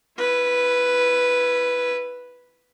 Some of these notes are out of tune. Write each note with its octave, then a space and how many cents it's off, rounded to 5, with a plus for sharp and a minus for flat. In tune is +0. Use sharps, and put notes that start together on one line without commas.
E4 +25 B4 +0